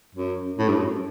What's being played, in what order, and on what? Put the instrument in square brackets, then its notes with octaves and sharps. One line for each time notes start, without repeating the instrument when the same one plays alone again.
[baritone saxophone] F#2
A2
G2
F#2